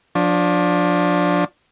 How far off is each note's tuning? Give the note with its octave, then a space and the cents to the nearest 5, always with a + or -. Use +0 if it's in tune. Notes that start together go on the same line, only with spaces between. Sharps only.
F3 +30 D4 +0